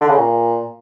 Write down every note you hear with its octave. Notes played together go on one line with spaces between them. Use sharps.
D3
C#3
A#2